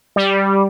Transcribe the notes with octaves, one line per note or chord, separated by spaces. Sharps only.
G3